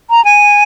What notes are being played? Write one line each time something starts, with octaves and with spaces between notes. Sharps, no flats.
A#5
G#5